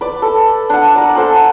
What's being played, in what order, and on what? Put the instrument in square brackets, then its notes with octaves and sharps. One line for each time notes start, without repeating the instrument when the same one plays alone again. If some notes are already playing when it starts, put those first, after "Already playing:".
[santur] B4 D5
A4
D4 F#5
A#4 D5
A4 C5 F#5 G#5